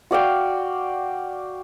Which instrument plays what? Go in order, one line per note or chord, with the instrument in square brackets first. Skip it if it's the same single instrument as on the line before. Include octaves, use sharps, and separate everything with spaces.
[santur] F#4 D5 F5 G5